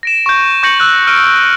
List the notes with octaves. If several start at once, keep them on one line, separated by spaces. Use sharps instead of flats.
A#6 D7 E7
C#6 G6
C#6 G6 A#6 C#7 E7 F#7
E6 F#6
F6 D7 D#7